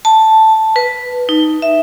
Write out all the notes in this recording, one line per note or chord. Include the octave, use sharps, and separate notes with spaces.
A5
B4
D#4
E5